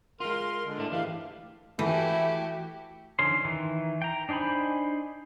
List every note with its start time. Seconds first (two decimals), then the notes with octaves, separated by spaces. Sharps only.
0.20 G#3 F4 A#4 C6
0.65 D3 G#3
0.78 A2 A3 D4
0.92 G2 E3 G3 D4 F5
1.79 E3 A3 E4 F#4 G4
3.19 D3 D#3 F3 C#4 C6
3.45 D#3 E3
4.02 G5 A#5
4.29 D4 D#4 C5 G#5 B5